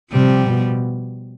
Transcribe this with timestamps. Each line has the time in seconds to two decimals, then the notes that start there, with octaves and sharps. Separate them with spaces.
0.12 C3 F3 G3
0.48 B2